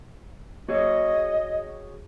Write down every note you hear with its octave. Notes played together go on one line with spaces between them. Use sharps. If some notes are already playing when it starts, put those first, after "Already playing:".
F#4 G#4 C#5 D#5